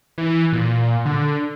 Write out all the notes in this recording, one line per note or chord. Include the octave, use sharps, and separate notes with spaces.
E3
A#2
D3